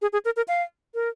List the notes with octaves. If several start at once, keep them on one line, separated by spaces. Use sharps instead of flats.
G#4
G#4
A#4
A#4
F5
A#4